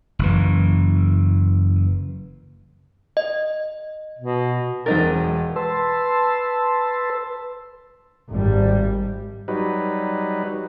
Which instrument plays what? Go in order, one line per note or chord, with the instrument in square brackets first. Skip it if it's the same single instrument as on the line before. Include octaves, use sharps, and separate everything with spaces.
[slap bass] F#1 E3
[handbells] D#5
[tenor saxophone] B2
[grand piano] E1 A6 [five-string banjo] C4 D#4 A#4
[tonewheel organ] B4 A5 C6 E6
[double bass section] G#1 G3
[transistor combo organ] F#3 G3 D#4 B4